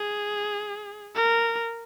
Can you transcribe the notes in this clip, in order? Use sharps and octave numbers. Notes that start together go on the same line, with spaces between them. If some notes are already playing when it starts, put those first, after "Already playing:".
Already playing: G#4
A#4